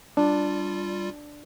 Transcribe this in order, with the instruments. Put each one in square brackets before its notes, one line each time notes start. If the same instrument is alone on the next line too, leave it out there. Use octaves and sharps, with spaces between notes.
[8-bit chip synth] G3 F4 [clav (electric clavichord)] D4